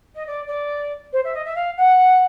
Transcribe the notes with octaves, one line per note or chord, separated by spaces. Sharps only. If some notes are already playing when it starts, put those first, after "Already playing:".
D#5
D5
D5
C5
E5
D#5
E5
F5
F#5